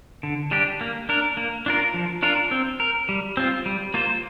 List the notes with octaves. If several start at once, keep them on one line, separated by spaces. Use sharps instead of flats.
D3
G3 D4 G4
A#3
D4 A#4
A#3
D4 F4 A#4
F3
D4 F4 A#4
C4
A#4
G3
C4 F4
G3
A#3 F4 C5